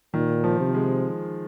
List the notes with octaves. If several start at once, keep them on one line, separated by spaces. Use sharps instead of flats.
A#2 D#3
F3
C3
G#3